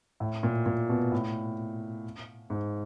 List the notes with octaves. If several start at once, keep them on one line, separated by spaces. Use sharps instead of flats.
A2
A#2
A#2
B2
A2
G#2